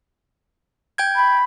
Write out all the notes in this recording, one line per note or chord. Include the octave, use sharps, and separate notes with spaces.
G5 G6 G#6
B5